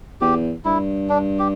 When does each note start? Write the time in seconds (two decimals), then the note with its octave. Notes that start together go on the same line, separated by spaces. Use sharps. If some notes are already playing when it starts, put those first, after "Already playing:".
0.21 E2 G4
0.65 G2 E4
1.09 D4
1.39 G4